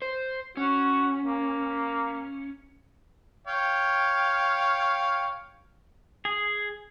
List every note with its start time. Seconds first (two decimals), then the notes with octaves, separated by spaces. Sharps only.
0.02 C5
0.57 C#4 F#4
1.25 A#3
3.47 C#5 F5 G5
6.25 G#4